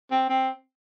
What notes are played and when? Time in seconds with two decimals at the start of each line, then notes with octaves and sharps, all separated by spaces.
0.11 C4
0.30 C4